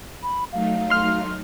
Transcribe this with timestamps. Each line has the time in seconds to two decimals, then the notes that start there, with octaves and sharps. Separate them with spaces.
0.23 B5
0.52 F#3 A3 D#4 F5
0.90 C6 F6